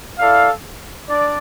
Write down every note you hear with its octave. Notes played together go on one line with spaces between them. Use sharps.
E4 A4 D5 F5
D4 D5